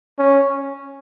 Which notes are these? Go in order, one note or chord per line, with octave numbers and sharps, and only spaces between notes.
C#4